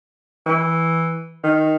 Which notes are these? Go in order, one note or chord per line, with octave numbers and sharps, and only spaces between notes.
E3
D#3